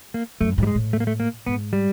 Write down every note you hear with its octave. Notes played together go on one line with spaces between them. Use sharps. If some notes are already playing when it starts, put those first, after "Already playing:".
A#3
F#2 A3
G#2
G3
G#3
A2
A3
A#3
A3
A#3
G#2 B3
G3